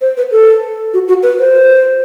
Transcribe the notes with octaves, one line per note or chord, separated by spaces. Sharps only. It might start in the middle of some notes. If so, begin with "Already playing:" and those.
C5
B4
A4
F#4
F#4
B4
C5